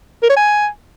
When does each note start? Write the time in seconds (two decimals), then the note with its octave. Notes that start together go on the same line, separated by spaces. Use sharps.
0.23 A#4
0.30 C#5
0.37 G#5